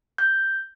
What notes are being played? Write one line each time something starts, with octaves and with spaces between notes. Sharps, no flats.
G6